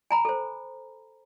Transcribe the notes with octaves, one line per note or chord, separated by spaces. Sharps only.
G#5 A#5 B5
A4 C5